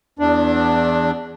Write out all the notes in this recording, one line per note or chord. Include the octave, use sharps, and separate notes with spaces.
E2 D4